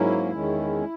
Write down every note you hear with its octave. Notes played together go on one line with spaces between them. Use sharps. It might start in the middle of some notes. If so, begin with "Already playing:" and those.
Already playing: G#2 F#3 A#3 C#4 E4
E2 D#3 G#3 C#4